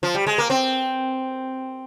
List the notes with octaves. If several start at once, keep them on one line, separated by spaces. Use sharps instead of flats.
F3
G3
G#3
A#3
C4